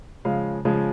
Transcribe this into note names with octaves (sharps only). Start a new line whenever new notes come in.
C#3 F3 G#3 F5
C#3 F3 G#3